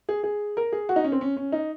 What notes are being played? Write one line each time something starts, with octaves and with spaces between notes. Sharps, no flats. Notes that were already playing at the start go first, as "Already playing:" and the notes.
G#4
G#4
A#4
G#4
F#4
D#4
C#4
C4
C#4
C#4
D#4